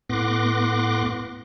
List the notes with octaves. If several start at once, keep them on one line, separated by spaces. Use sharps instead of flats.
A2 B3 C6 D6 F#6 A#6